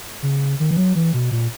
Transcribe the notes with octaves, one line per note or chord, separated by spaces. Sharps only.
C#3
D#3
E3
F#3
E3
B2
A#2